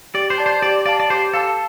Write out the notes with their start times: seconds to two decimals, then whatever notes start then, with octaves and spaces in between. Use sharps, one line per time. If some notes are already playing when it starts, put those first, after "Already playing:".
0.14 G4 D5
0.30 C5
0.38 D5 A5
0.46 C5
0.62 G4 D5
0.86 D5 F5 A5
1.00 D5
1.10 G4 C5
1.33 A4 F5 A5